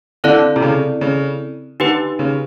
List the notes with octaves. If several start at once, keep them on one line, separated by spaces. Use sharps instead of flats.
D3 C4 E4 A4 D5
C3
C#3
C#3
D3 D#4 G4 B4
C#3